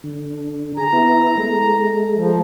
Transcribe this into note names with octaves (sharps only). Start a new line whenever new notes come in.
D3
G#4 A#5
B3 E4
G#3 A3
F3